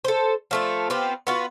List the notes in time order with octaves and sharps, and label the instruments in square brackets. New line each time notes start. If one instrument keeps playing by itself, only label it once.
[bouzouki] A4 C5
F3 A3 F4
B3 C4 F4 G4
B3 F4 F#4